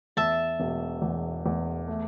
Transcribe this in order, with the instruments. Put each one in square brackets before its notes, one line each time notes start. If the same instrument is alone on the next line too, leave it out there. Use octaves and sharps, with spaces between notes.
[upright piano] E2 [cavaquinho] E5 A5
[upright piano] E1
E2
E2
A3